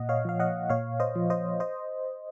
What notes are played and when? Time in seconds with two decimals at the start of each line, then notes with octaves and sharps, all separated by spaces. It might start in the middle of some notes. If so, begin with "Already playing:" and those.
Already playing: A#2 D#5 F#5
0.09 C#5 F5
0.25 F3 F5
0.40 D#5 F#5
0.70 A#2 C#5 F5
1.00 C5 D#5
1.15 F3
1.30 C5 D#5
1.60 C5 D#5